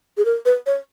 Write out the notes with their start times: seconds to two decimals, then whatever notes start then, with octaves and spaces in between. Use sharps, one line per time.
0.17 G#4
0.25 A#4
0.45 B4
0.66 C#5